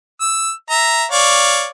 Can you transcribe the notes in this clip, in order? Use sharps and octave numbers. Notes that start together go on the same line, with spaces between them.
E6
E5 A#5
C#5 D5 F5